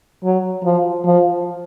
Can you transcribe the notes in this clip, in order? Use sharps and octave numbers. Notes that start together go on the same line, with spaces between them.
F#3
F3
F3